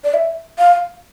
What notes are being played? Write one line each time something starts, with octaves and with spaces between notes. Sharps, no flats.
D5
E5
F5